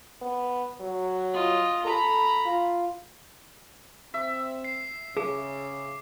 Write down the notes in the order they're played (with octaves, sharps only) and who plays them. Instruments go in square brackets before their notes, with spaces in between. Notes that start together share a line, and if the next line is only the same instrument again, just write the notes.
[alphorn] B3
F#3
[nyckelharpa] F4 D#5
[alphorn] A4 [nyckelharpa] A#5 B5
[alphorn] F4
[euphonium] C4 [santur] E5
[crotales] C7
[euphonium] C#3 [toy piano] G#4 [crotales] D6